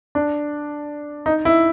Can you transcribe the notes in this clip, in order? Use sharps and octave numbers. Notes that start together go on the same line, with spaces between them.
D4
D#4
E4